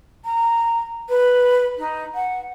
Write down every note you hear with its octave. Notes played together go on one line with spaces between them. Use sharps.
A#5
B4
D#4
F#5